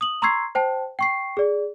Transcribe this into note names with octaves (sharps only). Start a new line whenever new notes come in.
D#6 F#7
A#5 C6 C#6 E6 G#6 C7
C5 G5 A5
G5 C#6 C7
G#4 D5